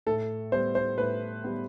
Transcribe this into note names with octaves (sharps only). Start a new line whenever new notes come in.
A2 A4
G3 B3 C5
C5
A2 B4
G3 B3